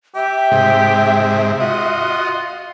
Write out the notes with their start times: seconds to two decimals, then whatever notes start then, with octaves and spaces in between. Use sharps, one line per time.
0.16 G4 E5
0.51 G#2 C3
1.60 F4 F#4 D#5